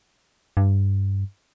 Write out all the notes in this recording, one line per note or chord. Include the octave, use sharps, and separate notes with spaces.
G2